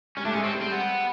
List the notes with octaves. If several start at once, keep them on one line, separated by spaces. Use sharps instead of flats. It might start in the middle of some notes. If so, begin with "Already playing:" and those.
G3 C#4
A3 D4
G#3 C#4
C4
G3
C4
B3